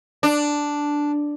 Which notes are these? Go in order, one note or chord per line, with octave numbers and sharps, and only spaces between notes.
D4